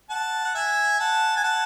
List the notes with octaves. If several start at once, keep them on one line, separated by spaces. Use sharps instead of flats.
F#5 A5
F#5
E5 G#5
F#5 A5
G#5
F#5 A5